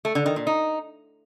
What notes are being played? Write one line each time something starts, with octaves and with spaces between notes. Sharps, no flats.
A3
D3
D#3
A#2
D#4